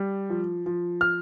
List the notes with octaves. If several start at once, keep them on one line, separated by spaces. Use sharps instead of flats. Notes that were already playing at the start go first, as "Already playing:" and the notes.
Already playing: G3
F3
F3
F6